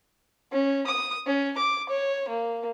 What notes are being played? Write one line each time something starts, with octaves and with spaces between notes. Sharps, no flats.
C#4
D#6
C#4
D6
C#5
A#3